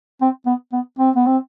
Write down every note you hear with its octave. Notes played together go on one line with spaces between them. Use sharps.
C4
B3
B3
C4
B3
C4